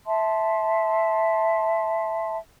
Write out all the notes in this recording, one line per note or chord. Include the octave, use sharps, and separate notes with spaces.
E5 A5 C6